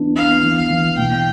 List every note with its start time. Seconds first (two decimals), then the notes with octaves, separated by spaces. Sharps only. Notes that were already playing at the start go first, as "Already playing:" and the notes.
Already playing: E3 B3 D4
0.16 B3 F5
0.43 E3
0.56 F5
0.70 E3
0.98 B2 G5